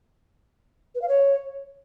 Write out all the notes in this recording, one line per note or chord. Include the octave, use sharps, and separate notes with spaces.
B4
F5
C#5